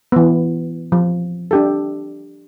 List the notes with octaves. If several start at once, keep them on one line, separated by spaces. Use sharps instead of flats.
E3 B3
F3
D4 G4 A4